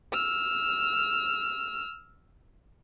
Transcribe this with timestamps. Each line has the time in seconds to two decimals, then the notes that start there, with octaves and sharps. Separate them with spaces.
0.13 E6 F6